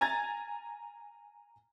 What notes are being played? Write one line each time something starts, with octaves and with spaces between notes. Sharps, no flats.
G#5 A#5 G#6 A6